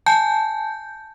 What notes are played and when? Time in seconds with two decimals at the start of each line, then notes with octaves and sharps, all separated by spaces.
0.06 G#5 A5 G6